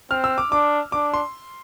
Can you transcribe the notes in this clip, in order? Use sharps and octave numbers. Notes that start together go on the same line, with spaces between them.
C4 F6
E6
D6
D4 D6
D4 D6
C6